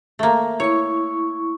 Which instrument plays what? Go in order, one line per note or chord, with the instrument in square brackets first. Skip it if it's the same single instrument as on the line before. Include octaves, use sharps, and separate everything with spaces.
[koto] A3 A#3
[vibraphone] E4 C#6 [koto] C#5